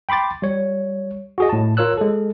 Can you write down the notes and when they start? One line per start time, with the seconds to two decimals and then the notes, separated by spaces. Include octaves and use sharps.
0.09 G5 B5 C6 D6 A6
0.42 G3 C#5
1.38 F#4 G#4 D#5
1.49 A2 A5
1.77 F4 A#4 C#5 E6 F#6
1.97 G#3 A4